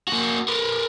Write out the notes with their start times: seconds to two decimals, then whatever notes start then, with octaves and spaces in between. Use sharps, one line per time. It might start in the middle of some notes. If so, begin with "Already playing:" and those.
0.08 A#3 F#4
0.48 A#4 B4